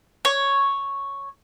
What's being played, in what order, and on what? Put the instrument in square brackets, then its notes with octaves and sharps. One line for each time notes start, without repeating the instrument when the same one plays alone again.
[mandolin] C#5